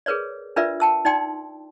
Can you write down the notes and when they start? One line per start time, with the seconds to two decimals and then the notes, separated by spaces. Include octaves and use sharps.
0.06 G#4 A#4 B4 C#5 D5
0.56 D4 F4 A#4 B4 D5 E5
0.80 G5 A5 E6
1.05 D#4 D5 G5 C6